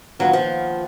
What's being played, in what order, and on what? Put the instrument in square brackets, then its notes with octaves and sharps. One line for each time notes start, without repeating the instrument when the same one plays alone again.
[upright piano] D#3 A#3 F4 B4 F5 [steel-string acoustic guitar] F#3
[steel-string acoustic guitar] F3